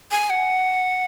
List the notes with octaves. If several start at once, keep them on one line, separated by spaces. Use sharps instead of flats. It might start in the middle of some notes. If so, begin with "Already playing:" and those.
G#5
F#5